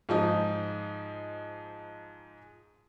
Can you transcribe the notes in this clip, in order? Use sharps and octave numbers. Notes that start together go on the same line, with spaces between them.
G#2 F3 D#4